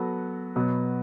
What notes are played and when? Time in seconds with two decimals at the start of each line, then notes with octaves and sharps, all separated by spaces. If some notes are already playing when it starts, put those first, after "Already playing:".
Already playing: F#3 B3 F#4 A4
0.56 B2 F#3 B3